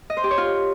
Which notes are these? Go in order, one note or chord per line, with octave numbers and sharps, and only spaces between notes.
D#5
C5
G4
C#5
F4